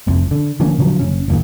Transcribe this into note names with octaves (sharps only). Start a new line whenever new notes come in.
F1 C2 F2
D3
D3 F3 A#3 C#4
B2 D3 F3 F#3
F#1 C#4
F#1 D#2 A#2